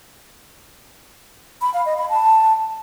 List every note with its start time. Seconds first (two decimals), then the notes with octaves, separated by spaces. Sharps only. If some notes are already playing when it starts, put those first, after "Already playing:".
1.62 B5
1.74 F5
1.86 D#5
1.98 B5
2.09 A5